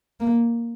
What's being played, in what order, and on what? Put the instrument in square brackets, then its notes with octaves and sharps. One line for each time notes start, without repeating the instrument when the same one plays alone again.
[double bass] A#3